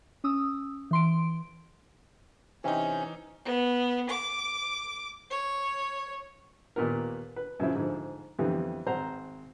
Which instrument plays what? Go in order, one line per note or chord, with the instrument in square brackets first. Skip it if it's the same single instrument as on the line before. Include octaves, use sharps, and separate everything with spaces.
[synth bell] C#4 D#6 E6
E3 C6 D7
[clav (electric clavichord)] C3 [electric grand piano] E3 D#4 [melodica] C#4
[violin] B3
D6
C#5
[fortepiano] D#2 A#2 B3 A#4
B4
F#2 C#3 F3 E4
G#2 D3 F3
F2 D3 E3 G3 B3
G#1 C5 F#5 A#5